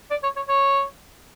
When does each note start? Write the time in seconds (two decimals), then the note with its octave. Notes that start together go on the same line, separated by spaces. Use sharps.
0.10 D5
0.23 C#5
0.36 C#5
0.48 C#5